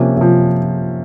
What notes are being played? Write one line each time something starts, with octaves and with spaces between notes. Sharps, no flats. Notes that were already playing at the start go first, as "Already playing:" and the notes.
Already playing: C3 F3 A#3 C#4
C3 F3